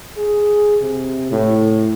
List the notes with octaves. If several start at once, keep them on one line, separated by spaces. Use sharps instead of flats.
G#4
C3
A2